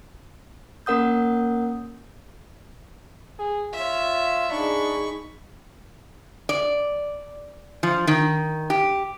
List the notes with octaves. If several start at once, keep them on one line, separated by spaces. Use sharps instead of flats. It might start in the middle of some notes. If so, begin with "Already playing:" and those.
A#3 C#4 A#4 F#5 D#6 G6
G#4
F4 C#5 E5
D4 D#4 G#4 B5 C#6
D5
F3
D#3
G4